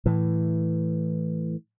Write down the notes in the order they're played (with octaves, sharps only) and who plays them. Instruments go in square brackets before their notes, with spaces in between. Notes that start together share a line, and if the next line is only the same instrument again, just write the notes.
[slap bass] A2 E3